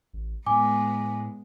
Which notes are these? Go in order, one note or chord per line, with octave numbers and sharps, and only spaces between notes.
A1
A2 G#3 B3 G#5 D6